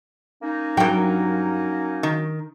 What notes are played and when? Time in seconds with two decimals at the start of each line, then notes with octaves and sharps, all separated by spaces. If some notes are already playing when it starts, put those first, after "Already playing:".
0.42 A#3 C#4 D#4
0.77 G2 F#3 A#4 G5
2.03 D#3